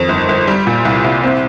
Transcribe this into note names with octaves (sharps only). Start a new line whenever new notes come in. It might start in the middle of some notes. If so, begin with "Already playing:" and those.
Already playing: F2 D#3
G1
G1
G3
A#2
C2
C2
C4